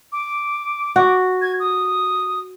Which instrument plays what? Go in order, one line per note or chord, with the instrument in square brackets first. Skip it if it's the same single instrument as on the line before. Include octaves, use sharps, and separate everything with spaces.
[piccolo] D6
[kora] F#4
[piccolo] G#6
D#6